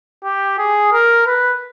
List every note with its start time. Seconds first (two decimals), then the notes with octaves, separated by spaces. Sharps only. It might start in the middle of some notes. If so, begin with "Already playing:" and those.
0.24 G4
0.58 G#4
0.92 A#4
1.26 B4